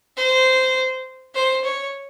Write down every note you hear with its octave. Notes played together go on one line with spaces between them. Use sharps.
C5
C5
C#5